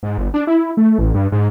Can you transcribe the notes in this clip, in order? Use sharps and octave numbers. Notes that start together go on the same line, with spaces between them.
G#2
G1
D4
E4
A3
A1
G2
G#2